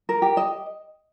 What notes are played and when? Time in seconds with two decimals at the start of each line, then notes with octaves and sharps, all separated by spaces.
0.09 A#4
0.22 G4
0.37 D#5